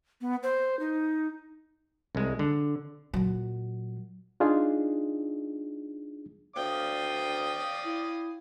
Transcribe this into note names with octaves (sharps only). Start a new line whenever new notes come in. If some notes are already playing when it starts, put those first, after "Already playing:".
B3
C5
D#4
C2 G#3
D3
A#2 F#3
D4 D#4 F4 G#4
D2 D5 F5 G5 D#6
E4